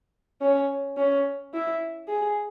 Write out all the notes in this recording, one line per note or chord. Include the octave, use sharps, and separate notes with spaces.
C#4
C#4
E4
G#4